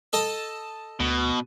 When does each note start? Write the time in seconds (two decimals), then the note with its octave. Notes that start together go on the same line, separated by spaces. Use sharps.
0.13 A4 D#5 A5
1.00 D2 B2